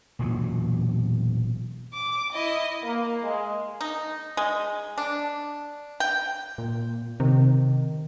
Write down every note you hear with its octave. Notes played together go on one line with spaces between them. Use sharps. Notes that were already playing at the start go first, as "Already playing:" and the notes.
E1 A#2 E3 F#3
D6
E4 D#5
A#3
G#3
D#4
G#3
D4
G5
A#2
C3 D#3